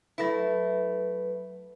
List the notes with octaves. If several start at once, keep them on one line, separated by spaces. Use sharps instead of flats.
F#3 A3 E4 B4